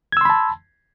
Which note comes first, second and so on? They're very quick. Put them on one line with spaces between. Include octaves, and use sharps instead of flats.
G#6 E6 C6 B5 A5